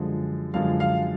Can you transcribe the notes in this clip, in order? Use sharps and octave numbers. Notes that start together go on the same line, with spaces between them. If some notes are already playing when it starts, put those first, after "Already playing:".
Already playing: F#2 D3 F3 G#3
F#2 D3 F3 G#3 F5
F5